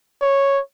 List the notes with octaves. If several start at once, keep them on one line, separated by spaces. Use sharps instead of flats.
C#5